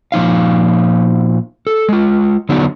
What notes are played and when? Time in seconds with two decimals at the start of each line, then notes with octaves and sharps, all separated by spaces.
0.12 A#2 F3 D#4 F5
1.67 A4
1.89 G#3 F4
2.49 D3 F#3 B3 D4 D#4